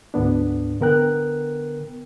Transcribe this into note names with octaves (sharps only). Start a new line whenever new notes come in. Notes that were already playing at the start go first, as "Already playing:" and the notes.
D2 G#2 B3 D4
D3 B3 A#4 G5 F#6